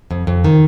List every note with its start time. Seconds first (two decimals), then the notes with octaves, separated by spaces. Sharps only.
0.11 F2
0.27 F2
0.44 D#3